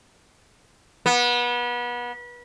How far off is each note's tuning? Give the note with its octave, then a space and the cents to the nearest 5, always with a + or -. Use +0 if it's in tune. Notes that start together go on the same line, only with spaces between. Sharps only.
B3 -30